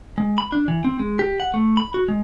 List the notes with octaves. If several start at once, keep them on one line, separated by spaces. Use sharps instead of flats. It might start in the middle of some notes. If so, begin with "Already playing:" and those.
G#3
B5
D4
E3
C4
G#3
G4
F#5
A3
B5
F#4
G#3